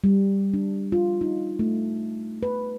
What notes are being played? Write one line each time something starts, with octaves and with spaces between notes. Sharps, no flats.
G3
D4
F4
D#4
A3
B4